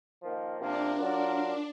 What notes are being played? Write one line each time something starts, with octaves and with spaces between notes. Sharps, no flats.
D#3 F3 A#3
C3 F3 A#3 D4
F#3 F4 A#4